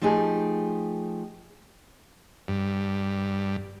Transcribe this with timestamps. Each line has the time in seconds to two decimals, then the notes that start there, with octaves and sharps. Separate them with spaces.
0.01 F3 A3 D#4 G4 G#4
2.48 G2